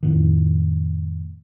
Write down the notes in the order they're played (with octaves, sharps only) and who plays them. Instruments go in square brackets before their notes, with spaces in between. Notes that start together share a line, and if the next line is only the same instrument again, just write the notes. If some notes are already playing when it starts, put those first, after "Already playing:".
[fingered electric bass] F2 A2 D#3